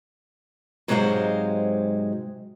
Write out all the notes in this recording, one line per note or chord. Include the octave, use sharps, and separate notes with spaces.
G#2 C3 F#3 G#3 C5 F5